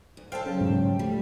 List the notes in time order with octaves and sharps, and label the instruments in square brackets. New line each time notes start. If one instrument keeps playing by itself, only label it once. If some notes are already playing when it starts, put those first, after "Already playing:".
[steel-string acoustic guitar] D2
[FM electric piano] A4 C5 F5 [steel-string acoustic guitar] G5 A5
[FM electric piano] C#3 [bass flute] F#3
[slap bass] G#2 G3
[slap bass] F3 [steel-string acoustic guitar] G3 [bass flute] A3